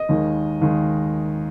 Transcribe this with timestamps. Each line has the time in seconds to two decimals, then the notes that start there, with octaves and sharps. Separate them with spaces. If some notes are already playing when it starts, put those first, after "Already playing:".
Already playing: D#5
0.09 D#2 D#3 G#3
0.61 D#2 D#3 G#3